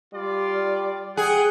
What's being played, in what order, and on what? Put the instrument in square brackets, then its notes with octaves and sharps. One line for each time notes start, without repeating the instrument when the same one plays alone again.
[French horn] G3 [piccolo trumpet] F4 [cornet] D5
[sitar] G#4 [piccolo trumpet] F#5 [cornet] G5